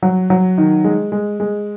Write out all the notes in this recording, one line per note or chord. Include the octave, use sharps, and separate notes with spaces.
F#3
F#3
D#3
G#3
G#3
G#3